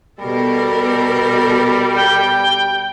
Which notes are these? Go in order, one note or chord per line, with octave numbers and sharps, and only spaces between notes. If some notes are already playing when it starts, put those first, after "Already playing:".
B2 G3 A4 A#4
G5